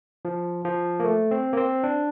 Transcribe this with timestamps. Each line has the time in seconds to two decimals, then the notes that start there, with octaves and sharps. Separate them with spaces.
0.25 F3
0.65 F3
1.00 A#3
1.05 A3
1.31 C4
1.53 A#3
1.57 C4
1.83 D4